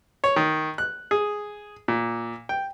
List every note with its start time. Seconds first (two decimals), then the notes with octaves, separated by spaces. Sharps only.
0.24 C#5
0.36 D#3
0.78 F#6
1.11 G#4
1.88 A#2
2.49 G5